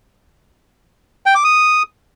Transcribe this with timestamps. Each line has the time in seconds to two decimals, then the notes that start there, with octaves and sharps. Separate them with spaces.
1.26 G5
1.35 D6
1.44 D#6